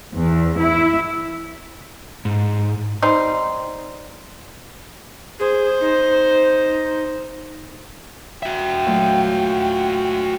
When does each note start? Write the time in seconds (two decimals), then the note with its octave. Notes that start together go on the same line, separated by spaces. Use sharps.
0.16 E2
0.60 E4
2.25 G#2
3.02 G3 C4 D#4 C5
5.39 G#4 C5
5.81 D#4
8.43 F#4 E5 G5
8.86 A#2 F#3 A3